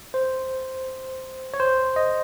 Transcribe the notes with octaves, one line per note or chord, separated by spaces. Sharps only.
C5
C#5
C5
D#5